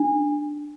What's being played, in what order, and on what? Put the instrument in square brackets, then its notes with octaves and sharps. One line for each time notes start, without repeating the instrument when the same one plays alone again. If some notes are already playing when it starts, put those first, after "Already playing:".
Already playing: [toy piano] D4